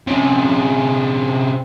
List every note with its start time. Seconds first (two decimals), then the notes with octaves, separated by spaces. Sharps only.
0.07 C3 C#4